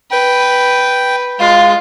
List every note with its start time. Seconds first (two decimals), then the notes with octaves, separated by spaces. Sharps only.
0.11 B4 G5
1.40 G#3 F4 F5